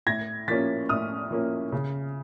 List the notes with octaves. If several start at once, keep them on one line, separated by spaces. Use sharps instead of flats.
A2 G#6 A#6
F3 A#3 C#4 A6 B6
A2 D#6 F6
F3 A#3 C#4
C#3